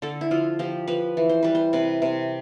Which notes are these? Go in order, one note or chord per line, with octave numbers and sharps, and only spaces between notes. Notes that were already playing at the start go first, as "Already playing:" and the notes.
D3 A4
E4
F3 F4
F3 G4
F3 B4
E3
C5
G3 B4
C5
C3 B4
C3